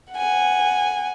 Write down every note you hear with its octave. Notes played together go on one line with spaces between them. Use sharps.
F#5 G#5